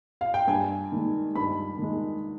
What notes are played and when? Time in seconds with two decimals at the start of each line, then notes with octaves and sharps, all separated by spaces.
0.21 F5
0.34 G5
0.48 G2 G#5
0.92 D#3 G#3
1.35 G2 B5
1.78 D#3 G#3